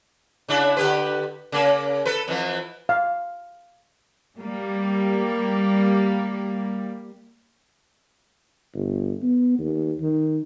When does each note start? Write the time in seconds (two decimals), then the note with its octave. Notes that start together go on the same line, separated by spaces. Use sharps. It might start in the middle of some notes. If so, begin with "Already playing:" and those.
0.49 C#3 D4 E4
0.77 D3 G4 B4
1.52 C#3 A#3
2.05 A4 B4
2.28 F2 E3
2.89 F5
4.39 G3 A#3
8.74 G1
9.22 B3
9.59 D#2
10.00 D#3